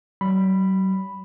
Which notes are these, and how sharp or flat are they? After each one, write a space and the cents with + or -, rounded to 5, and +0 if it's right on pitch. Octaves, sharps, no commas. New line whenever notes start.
F#3 +45 B5 +0